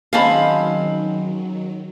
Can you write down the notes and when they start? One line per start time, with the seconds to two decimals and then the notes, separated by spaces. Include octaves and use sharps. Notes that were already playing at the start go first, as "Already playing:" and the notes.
0.13 D#3 F#3 G#3 C4 C#4 F5 A5 B5